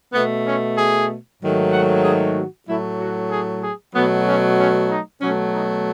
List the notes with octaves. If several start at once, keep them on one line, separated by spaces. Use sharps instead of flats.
B2 A3 B3
C#4
G#4
G#2 D#3 F#3 A3
F#5
G#4
F#4
A2 F#3 A3 E4
F#4
G#4
G#4
B2 F#3 A3 B3
C#4
C#4
D#4
B2 F#3 A3 C#4
D#4